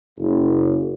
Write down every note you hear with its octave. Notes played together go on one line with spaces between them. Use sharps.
F#1